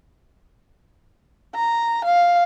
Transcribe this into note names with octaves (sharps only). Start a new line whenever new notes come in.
A#5
F5